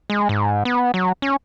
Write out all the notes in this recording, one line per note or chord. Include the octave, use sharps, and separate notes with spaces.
G#3
G#2
B3
F#3
C#4